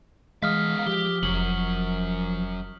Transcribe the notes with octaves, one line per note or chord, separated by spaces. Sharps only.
E3 G#3 B3 F5 D#6 F6 B6
F3 G4 G7
F1 F#3 C#4 F#7